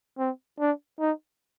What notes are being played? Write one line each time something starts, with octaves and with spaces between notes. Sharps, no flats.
C4
D4
D#4